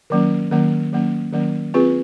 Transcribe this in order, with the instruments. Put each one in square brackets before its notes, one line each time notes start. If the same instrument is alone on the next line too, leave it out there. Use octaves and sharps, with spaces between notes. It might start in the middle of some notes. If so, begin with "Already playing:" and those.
[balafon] D#3 F#3 A#3 C#4
D#3 F#3 A#3 C#4
D#3 F#3 A#3 C#4
D#3 F#3 A#3 C#4
C4 F4 G#4 B4